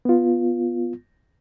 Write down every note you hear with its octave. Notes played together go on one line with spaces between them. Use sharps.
B3 F4